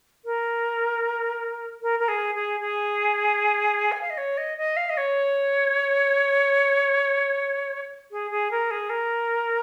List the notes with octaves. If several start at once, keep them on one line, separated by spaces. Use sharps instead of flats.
A#4
A#4
A#4
G#4
G#4
G#4
G#5
F5
D#5
C#5
D#5
D#5
F5
D#5
C#5
G#4
G#4
A#4
G#4
A#4